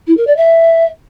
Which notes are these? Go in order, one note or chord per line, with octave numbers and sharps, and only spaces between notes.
E4
A#4
D5
E5